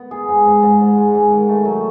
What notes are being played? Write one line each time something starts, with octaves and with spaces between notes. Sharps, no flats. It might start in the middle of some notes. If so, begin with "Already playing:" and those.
Already playing: B3
G#4
G#2
G#2
G#2
G#2
G#3
G#2
D#3
A3
F#3